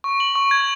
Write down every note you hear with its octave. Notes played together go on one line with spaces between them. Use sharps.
C#6
F#7
C#6
G#6